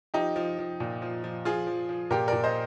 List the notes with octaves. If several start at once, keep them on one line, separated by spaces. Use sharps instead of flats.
F3 D#4 G4
F3
F3
A#2
F3
F3
F3 F4 G#4
F3
F3
A#2 G4 A#4
A#2 A#4 D5
C5 D#5